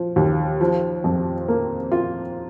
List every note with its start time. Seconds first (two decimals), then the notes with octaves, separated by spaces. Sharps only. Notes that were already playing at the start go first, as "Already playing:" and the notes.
Already playing: F3
0.16 D#2
0.61 F3
1.04 F2
1.48 A#3
1.92 F4